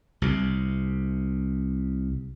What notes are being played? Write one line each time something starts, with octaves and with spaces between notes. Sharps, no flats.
C2 C3